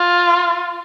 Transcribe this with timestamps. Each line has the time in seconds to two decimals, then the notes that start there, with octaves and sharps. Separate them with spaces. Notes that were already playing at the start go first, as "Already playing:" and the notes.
Already playing: F4